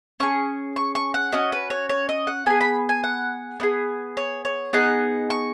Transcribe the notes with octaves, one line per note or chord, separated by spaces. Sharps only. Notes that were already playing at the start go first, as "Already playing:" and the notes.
C#4 G#4 C#6
C#6
C#6
F#5
C#4 F#4 D#5
B4
C#5
C#5
D#5
F#5
B3 G#4 G#5
B5
G#5
F#5
B3 D#4 G#4
C#5
C#5
B3 D#4 G#4 F#5
C#6